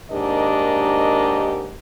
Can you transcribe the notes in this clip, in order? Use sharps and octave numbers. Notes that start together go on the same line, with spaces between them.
D#2 G#2 D4 G4 A#4 D#5